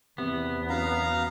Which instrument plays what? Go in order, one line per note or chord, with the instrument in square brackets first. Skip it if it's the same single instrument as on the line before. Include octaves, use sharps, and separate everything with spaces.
[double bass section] E2 [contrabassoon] C3 [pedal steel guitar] B3
[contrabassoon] F#2 [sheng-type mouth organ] F5 A#5